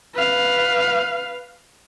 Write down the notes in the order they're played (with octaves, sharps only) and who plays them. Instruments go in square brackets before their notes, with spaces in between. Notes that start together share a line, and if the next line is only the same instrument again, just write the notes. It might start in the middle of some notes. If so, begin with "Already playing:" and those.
[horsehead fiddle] B4 F5